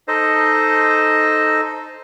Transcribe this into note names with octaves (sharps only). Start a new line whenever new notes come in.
D#4 A4 C5 D#5